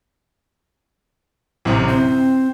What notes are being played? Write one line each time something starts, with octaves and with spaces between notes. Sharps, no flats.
A1 F#2 C3
C4 C5